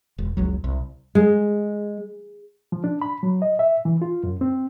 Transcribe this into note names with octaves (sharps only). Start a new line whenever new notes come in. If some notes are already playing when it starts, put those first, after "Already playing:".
E1
F#1 C#2 F#3
C2
G#3
F3
D4
B5
F#3
D#5
E5
E3
F4
F#2
C4